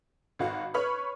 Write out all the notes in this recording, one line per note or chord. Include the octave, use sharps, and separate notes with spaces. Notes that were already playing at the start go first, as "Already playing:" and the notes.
G#1 F#4 F5
B4 C#5 B5 C#6 F6